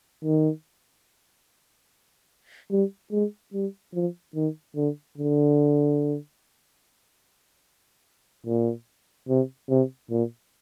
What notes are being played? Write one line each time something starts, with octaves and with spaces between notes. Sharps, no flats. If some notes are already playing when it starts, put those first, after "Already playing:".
D#3
G3
G#3
G3
F3
D#3
D3
D3
A#2
C3
C3
A#2